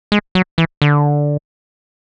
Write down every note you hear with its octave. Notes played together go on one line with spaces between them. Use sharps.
G#3
F#3
E3
D3